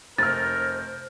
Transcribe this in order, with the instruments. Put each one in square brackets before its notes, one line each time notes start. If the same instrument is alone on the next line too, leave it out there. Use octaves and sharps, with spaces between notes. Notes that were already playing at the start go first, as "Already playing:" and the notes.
[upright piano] F1 F6 [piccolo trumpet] A#4 [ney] C5 [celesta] A6